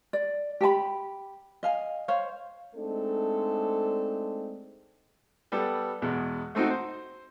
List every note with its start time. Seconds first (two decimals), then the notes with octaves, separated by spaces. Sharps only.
0.13 D5
0.61 G4 G5 A5 B5
1.63 D#5 F5 G#5
2.08 C5 C#5 F5
2.76 G#3 A3 C4 D4 D#4 A4
5.52 G3 B3 A4
6.02 E2 B2 G#3
6.55 A3 C4 D#4 F#4
6.70 C5